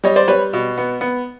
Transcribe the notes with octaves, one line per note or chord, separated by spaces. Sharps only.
G3 C#5 D#5
C5 D5
G3 B4 C#5
B2
B3
B3